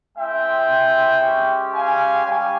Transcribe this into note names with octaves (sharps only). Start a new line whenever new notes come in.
G#3 C4 E4 E5 G5
G#3 C#4 G4
F5 G#5
G3 C#4 G4 F5 G#5